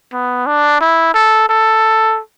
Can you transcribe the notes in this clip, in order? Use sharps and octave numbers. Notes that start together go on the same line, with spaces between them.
B3
D4
E4
A4
A4